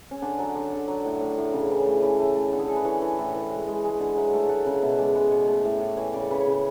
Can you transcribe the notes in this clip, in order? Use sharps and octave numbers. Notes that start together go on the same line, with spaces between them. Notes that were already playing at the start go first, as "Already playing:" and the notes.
C#4
D3 D4
F#3
D3
D3
F#3
A2
A2
A2
C#3
E3
A3
E3
A3
A3
D3
G#4
D3 A4
B4
E3 C#5
E3
A2
E3
G#3
G#3
G#3
D3
F#3 E5
A3
A3 F#5
C#3
B2 E5
G#3 D5
G#3 B4
B2 C#5
A3 D5
A2 E5
A2 C#5 D5
E3 C#5
C#3 D5
C#5
C#3 B4
C#5
C#3